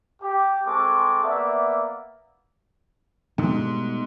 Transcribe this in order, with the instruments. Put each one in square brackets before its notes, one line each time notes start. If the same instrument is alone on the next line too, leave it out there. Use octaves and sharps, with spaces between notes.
[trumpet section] G4
G#3 C4 G#4 A4 C#6 D6
A#3 B3 D5 E5
[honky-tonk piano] G#2 [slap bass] B2 G3 A3